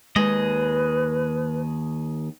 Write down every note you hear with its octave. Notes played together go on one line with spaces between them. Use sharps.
D#2 G#3 G#4 B4 D#5